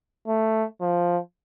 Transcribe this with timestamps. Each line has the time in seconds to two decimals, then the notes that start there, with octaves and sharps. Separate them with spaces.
0.28 A3
0.81 F3